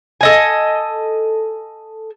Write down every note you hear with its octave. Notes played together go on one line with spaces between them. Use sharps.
A4 D#5 G#5